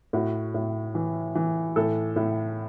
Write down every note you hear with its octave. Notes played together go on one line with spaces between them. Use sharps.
A2 F#4
A2
E3
E3
A2 A4
A2